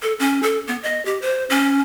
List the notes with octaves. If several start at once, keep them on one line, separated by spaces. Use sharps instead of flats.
A4
C#4
A4
B3
D#5
G4
C5
C#4